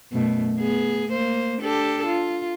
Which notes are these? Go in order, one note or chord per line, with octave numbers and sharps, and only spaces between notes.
F#2 B2 A3
B3 G#4
A#3 C5
D4 G4 A4
F4